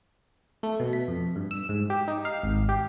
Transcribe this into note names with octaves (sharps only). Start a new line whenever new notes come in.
A3
B2
B6
F2
G2
E6
G#2
G4
D#4
F5
G#1
G4